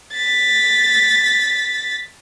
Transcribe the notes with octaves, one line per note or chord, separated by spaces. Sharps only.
A6 B6